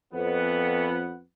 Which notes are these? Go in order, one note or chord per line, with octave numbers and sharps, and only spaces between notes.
F2 B3 F#5